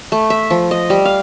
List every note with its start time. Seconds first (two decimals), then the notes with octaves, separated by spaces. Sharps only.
0.12 A3
0.30 E5
0.50 F3
0.71 D#5
0.90 G3
1.05 F5